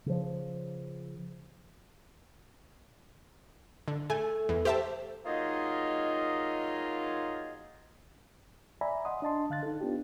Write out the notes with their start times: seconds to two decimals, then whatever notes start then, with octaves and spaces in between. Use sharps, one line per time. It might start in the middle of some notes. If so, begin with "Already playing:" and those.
0.06 C#3 F3
3.88 D3
4.10 A3 G#5
4.49 E2
4.65 G4 C5 E5 A5
5.26 F#3 A#3 D#4 F4 G#4 D#5
8.81 D5 E5 G#5 A#5 B5
9.05 D#5 F#5 C6 D#6
9.22 D4 D#5 A5 C6
9.50 D3 F5 F#6 A6
9.63 D#4 A4
9.81 B3 D4 F4 G4